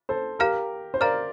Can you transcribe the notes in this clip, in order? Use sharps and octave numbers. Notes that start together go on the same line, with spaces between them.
A4 C5
G4 A#4 F5 A#5 F6
C5
A#4 D5 F5 A#5 F6